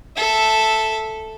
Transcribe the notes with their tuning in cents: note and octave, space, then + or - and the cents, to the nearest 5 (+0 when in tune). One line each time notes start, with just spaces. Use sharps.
A4 +0 E5 -5